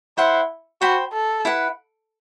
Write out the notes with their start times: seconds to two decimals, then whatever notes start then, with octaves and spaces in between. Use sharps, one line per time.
0.17 E4 C5 F#5 C6
0.81 F#4 C5 G5 B5
1.13 A4
1.45 E4 B4 F#5